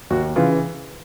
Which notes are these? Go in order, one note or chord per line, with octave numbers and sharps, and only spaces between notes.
D#2 F#4
C#3 E3 F4